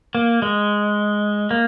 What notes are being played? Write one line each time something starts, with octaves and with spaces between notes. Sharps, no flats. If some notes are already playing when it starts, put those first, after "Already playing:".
A#3
G#3
A#3